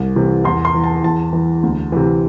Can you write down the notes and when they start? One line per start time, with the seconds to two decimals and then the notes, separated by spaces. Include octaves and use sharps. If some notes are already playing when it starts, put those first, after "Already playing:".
Already playing: C2
0.16 C3 E3
0.44 E2 C6
0.65 C6
0.74 E3
0.84 A5
1.03 E2 A5
1.33 E3
1.63 D2
1.92 C3 E3